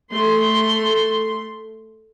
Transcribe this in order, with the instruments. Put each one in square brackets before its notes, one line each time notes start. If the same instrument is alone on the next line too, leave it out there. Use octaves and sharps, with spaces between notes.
[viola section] A3 C6